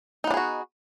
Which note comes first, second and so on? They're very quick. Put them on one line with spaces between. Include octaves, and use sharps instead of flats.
D#4 B3 D4 G#4 F#4